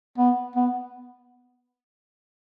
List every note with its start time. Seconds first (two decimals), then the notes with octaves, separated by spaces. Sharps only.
0.18 B3
0.56 B3